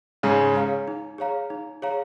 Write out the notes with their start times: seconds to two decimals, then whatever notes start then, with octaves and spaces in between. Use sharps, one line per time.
0.23 G#2 C#3 D#4
0.55 G#4 C#5 F5 A#5
0.88 D#4
1.18 G#4 C#5 F5 A#5
1.50 D#4
1.82 G#4 C#5 F5 A#5